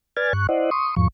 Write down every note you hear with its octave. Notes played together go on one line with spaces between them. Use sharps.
B4 D5 G#5 F6 G#6 A6
G2 C#6 F#6
E4 C5 D5 D#5 F#5
C6 C#6 D#6
E2 G#2 F3 C#6